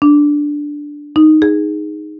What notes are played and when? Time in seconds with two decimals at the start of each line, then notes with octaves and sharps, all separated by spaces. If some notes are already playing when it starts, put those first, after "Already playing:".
0.02 D4
1.16 D#4
1.42 G#4